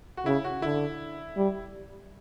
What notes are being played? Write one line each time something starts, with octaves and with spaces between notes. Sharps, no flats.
F#4
C#3 E4
F#4
D3 E4
G3